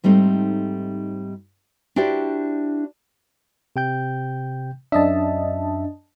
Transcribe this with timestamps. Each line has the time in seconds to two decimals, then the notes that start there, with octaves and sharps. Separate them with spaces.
0.04 G#2 G3 A3 C4 D#4
1.96 D4 E4 F#4 G4 C5 D5
3.76 C3 G5 G6
4.92 F#2 D4 D#5 E5 A5